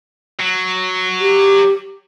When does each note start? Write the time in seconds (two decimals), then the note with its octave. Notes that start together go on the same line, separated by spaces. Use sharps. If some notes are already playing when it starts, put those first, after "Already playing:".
0.40 F#3
1.20 G4